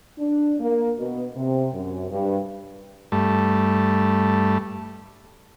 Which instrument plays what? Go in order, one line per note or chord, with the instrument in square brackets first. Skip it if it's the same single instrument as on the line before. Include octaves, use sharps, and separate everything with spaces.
[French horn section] D4
A#3
B2
C3
F#2
G2
[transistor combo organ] G2 A3